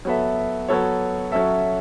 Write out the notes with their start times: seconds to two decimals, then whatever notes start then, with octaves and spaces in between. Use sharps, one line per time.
0.05 F#3 B3 A4 E5
0.68 F#3 B3 A4 C#5
1.32 F#3 C#4 A4 E5